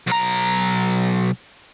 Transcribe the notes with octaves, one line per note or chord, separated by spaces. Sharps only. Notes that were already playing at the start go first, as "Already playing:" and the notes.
B1 A#5